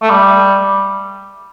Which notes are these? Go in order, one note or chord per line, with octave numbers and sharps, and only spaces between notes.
A3
G3